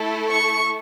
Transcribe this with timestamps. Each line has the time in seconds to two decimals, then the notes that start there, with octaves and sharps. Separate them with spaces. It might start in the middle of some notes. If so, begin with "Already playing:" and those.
Already playing: A3 E4 A4
0.29 C#6